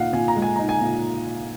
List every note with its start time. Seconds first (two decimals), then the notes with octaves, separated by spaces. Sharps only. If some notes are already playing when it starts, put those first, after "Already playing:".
Already playing: A#2 D#4 F5 F#5
0.13 A#2 G#5
0.28 A#5
0.36 G#3
0.42 G#5
0.56 D#4 A#5
0.69 G#5
0.81 A#2